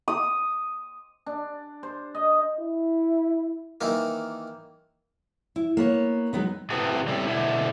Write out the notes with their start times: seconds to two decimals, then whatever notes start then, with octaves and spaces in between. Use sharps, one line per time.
0.08 D#6
1.26 D4
1.83 C5
2.15 D#5
2.59 E4
3.81 D#3 E3 A#3
5.56 E4
5.77 A#3 B3 C#5
6.33 F#3 G#3 B3 D#4
6.70 C3 E3 A3 B3 C4
7.08 G3 C4 C#4 E4 G4 A4
7.27 B2 D3 A3 E4